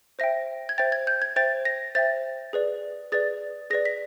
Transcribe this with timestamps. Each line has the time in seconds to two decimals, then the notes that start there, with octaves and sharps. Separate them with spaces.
0.19 C5 E5 G5 A#6
0.69 G#6
0.78 C5 E5 G5 A6
0.92 G#6
1.07 G6
1.22 G#6
1.36 C5 E5 G5 A6
1.65 A#6
1.95 C5 E5 G5 A6
2.53 G#4 B4 D5
3.12 G#4 B4 D5 A6
3.70 G#4 B4 D5 A#6
3.85 B6